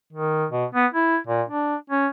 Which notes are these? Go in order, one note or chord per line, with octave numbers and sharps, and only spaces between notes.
D#3
B2
B3
E4
A#2
D4
C#4